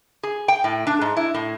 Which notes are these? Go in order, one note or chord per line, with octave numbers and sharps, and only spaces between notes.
G#4
G5
A2
D4
G#2
E4
A2